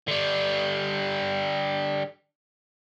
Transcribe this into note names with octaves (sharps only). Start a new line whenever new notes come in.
D3 G3